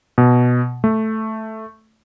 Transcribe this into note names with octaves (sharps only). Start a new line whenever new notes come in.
B2
A3